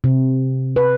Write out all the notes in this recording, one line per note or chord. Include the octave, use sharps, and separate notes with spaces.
C3
B4